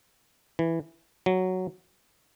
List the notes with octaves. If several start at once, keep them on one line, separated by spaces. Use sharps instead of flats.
E3
F#3